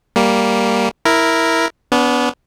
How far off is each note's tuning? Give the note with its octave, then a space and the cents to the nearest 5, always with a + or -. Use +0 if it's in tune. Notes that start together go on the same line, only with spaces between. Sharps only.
G3 +0 A#3 +0
E4 -5 A#4 +0
B3 +0 D4 -40